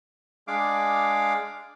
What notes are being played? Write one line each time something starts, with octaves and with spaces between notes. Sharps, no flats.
G#3 D4 F5 D6